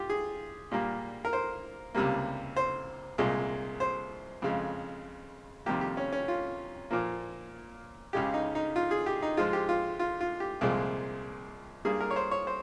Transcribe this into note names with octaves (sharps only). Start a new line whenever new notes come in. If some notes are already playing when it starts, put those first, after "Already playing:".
Already playing: F4 G4
G#4
A#2 G3 A#3
A#4
C5
C#2 C3 G3 A#3
C5
C2 A#2 G#3
C5
F2 C#3 G#3
F2 C3 D#3 G3 A#3 G4
G4
C#4
C#4
F4
A#2 F3 A#3
C#2 C#3 G#3 G4
D#4
D#4
F4
G#4
G4
D#4
G#2 F3 G#3 F4
G4
F4
F4
F4
G4
C2 A#2 F3 G#3
G2 G3 A#3 G#4
A#4
C#5
C5
C#5
C5